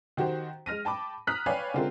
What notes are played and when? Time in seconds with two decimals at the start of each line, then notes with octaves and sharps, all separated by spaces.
0.17 D#3 F#4 G4 C5
0.66 G#3 F6 A#6 D#7
0.85 G5 A5 B5 D6
1.27 A#5 D#6 F6 F#6 B6
1.46 B4 C#5 D5 F5 G5 G#5
1.74 D3 G#3 C4 F4 A#4